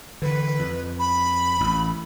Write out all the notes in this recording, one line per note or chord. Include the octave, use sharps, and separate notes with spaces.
D3 E3 B4
F2
B5
A1